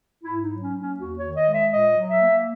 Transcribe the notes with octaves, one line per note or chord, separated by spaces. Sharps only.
G#2 E4
D#4
F#3
C#4
A#3
C#4
E2 F#4
C#5
D#3
D#5
G#3
E5
A#2 D#5
F#3
E5
A#3